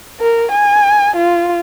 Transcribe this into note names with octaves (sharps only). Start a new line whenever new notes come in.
A#4
G#5
F4